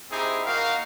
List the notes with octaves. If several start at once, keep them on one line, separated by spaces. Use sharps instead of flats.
C4 D#4 E4 G4 G#4
A#3 D#4 F#4 A#4 F5